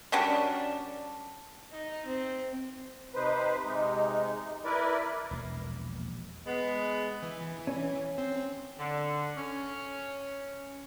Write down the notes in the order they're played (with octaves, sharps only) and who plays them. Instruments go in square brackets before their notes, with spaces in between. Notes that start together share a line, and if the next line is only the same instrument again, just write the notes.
[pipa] F#3 G3 C#4 D4
[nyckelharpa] D#4
C4
[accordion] C3 D#4 B4 C5
C3 G#3 D#4
E4 A#4 B4 D5
[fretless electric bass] E1 [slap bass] A#1 A#3
[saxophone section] G#3 B3
[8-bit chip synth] E3
[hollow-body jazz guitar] C#4
[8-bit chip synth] C4
[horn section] D3
C#4